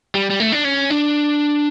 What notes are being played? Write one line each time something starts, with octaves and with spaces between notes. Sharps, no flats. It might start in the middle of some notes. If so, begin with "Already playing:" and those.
G3
G3
A3
D4
C#4
D4